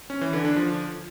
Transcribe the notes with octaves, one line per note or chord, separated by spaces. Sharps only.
C#4
E3
D3
D4
F3